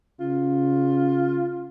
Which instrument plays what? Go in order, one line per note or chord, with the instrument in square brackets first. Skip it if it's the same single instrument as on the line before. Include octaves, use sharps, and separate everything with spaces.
[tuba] C#3 [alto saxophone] F4